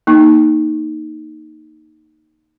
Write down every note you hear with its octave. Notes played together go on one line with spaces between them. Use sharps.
A#3 D#4